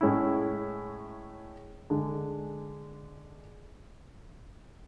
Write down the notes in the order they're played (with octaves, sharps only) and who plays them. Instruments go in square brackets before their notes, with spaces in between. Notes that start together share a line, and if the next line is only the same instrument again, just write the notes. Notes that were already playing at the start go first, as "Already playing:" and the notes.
[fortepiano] A2 G#3 C#4 E4
D3 G#3 D4